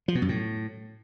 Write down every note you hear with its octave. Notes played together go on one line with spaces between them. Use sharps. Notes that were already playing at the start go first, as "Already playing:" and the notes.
F3
B2
F#2
A2